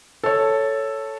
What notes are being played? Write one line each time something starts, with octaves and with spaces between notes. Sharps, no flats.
A4 C#5